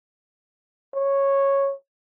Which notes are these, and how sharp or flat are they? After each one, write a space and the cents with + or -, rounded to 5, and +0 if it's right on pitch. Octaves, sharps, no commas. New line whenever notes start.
C#5 -10